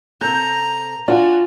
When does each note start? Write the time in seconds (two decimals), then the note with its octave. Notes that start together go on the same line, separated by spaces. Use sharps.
0.21 C3 A4 A#5 G6
1.08 D4 F4 F#4 G#5